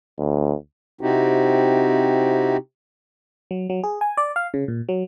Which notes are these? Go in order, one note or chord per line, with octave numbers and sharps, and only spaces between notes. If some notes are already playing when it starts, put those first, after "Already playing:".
D2
C3 C4 D#4 E4 F#4 G4
F#3
F#3
G#4
G#5
D5
F5
C#3
A#2
F#3